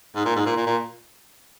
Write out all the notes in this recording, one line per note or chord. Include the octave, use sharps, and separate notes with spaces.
G#2
A#2
G#2
A#2
A#2
A#2